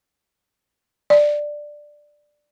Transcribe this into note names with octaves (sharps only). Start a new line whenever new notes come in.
D5